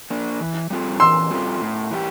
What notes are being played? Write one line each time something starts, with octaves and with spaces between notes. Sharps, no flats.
A#3 D4
E3
G3 C4 F4 A4
E3 C6 E6
G3 C4 F4 A4
A2
E3 G3 D4 G4